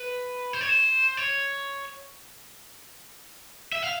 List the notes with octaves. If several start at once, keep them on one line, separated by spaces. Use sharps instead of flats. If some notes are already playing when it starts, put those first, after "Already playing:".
Already playing: B4
C5
C#5
C5
C#5
E5
F5